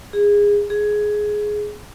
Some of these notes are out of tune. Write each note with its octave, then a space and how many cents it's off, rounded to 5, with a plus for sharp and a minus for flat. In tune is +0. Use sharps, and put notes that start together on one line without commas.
G#4 -20
G#4 +10